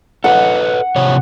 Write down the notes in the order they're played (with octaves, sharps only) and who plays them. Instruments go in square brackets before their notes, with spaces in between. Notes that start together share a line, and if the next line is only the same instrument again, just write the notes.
[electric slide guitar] A4 B4 D#5 [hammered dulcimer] F#5
[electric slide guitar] C3 F3 C#5